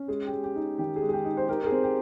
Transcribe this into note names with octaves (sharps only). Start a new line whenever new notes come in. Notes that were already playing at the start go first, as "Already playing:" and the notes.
Already playing: C#4
G#3 G#4
G4
G#3
G4
D#4
D#3 G4
G#4
G#3
G#4
G4
D#4
C5
D#4 G4 A#4
A#4
G#4
C4
G4